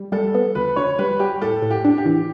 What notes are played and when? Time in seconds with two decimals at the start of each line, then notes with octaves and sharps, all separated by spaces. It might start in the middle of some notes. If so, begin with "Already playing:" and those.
Already playing: G3
0.12 G3 A4
0.35 B3
0.55 D2 B4
0.76 D2 C#5
0.99 G3 B4
1.19 G3 G4
1.42 A2 A4
1.62 A2
1.71 G4
1.85 D4
1.98 G4
2.06 E3